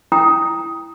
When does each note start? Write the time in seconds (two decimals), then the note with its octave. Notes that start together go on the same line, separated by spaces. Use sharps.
0.12 E4 G5 A#5 D#6